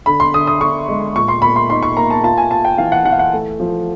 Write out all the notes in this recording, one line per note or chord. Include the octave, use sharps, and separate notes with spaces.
D3 B5
C6
D3 D#6
D#6
D3 C#6
G#3
A#2 C#6
C6
A#2 B5
C6
D#4 C6
C#6
A#3 A#5
A5
F4 A5
G#5
F4 A5
G5
E3 F5
F#5
E3 F#5
F5
F#5
A3
F3